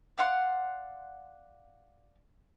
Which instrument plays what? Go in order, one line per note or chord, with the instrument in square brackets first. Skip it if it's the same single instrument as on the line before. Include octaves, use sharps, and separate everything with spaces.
[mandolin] D5 F5 F#5 C6